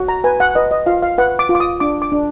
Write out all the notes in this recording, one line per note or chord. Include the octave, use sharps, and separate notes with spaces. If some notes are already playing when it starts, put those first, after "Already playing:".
Already playing: F#4
A#5
B4 G#5
F#5
B4 D#5
D#5
F4 F5
F5
B4 F#5
D6
F4
D6
D#6
D4 D6
D6
D4